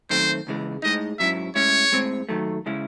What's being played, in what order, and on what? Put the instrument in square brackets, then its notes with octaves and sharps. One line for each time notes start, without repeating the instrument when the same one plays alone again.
[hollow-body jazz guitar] F#2 D#3 A3 C4 [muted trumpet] C5
[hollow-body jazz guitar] C#2 C#3 E3 G#3
[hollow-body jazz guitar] A2 G#3 D#4 [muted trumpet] D#5
[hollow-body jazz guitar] G#2 F#3 C#4 E4 [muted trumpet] E5
[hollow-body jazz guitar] A2 G#3 C#4 E4 [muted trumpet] C#5
[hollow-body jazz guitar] A2 G#3 C4
D#2 D#3 F#3 A3
C#3 G#3 C#4 E4